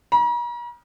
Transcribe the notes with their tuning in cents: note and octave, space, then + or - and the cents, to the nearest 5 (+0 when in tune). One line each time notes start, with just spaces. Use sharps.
A#5 +45